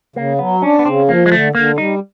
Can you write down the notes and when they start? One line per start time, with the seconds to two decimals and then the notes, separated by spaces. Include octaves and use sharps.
0.16 C#3 A#3
0.39 F#3 B3
0.62 C#4 D4
0.79 B3
0.85 C#3 C4
1.09 F3 A#3
1.26 G#3
1.32 D3 A3
1.55 D3 A#3
1.78 G3 D#4